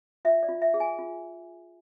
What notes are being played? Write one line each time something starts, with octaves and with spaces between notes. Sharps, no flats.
F4 E5
D5
F4
E5
G#4
G#5
F4